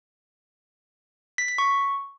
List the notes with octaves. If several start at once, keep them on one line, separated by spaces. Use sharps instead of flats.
B6
B6
C#6